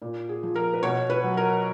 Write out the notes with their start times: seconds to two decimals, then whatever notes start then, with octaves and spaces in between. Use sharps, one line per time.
0.02 A#2
0.29 G#4
0.43 F3
0.56 A#4
0.74 B4
0.83 B2 C#5
1.10 B4
1.24 F#3
1.37 A#4